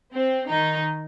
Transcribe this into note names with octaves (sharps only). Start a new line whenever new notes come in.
C4
D#3 D#4